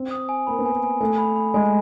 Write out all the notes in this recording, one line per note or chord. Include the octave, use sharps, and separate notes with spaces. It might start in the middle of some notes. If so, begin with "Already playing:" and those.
Already playing: C4
D#6
G#5
A#3 B5
B3
A#3 G#5
G#5
A3 G#5
B5
B5
G#3 G#5